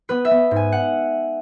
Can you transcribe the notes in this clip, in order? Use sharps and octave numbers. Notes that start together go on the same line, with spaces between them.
B3 B4
E5
B3
G#2
G#5
F#5